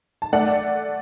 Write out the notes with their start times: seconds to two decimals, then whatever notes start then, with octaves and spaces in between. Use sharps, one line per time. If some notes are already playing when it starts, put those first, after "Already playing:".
0.22 A5
0.33 A3 D5 F#5